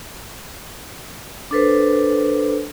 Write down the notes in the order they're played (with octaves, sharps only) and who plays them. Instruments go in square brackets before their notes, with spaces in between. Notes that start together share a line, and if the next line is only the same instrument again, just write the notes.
[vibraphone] D4 A4 B4 C5